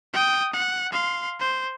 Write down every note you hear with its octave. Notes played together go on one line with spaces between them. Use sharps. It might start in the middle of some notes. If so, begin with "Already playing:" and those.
G5 D#6
F#5
F5 C6
C5